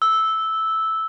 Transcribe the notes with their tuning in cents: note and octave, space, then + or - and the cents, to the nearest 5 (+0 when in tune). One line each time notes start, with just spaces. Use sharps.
E6 -10